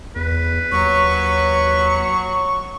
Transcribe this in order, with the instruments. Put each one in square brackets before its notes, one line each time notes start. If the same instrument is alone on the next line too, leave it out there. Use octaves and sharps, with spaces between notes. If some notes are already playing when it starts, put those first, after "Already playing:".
[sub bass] E2 [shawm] B4
[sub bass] D#2 [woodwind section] F#3 [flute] C#6